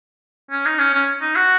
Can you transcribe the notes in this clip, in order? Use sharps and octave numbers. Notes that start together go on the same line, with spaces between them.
C#4
D#4
C#4
C#4
D#4
F#4